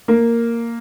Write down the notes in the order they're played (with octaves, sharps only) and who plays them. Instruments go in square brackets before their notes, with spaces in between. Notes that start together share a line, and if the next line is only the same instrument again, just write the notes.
[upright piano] A#3